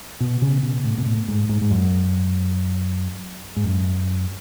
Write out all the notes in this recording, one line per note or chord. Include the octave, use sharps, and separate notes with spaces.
B2
C#3
B2
A2
B2
A2
G#2
G#2
G#2
F#2
G#2
F#2